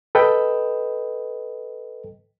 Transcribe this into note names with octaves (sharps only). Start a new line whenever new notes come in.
A4 B4 D#5 G5